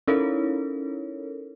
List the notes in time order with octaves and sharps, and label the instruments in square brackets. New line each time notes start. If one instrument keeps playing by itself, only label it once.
[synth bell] C#4 D#4 E4 A4 A#4 C#5